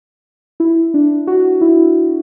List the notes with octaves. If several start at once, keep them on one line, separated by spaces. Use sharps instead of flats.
E4
D4
F#4
E4